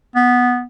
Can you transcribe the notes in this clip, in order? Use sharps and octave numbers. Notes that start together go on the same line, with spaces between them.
B3